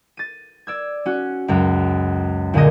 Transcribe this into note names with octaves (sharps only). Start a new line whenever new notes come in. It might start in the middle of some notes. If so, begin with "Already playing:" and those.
A6 D#7
D5 E6 G#6
C#4 F#4
C#2 F#2
D2 A#2 D3 G#4 D#5